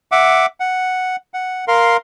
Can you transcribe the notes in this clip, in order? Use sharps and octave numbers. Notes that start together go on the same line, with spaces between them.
E5 F#5 D6
F#5
F#5
A#4 F5 C6